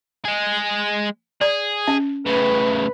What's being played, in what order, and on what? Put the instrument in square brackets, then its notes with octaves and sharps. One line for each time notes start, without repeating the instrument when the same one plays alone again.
[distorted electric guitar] G#3 G#4
[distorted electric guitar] G#4 [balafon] D5
[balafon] C#4
[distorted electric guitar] A2 C#3 [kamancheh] B4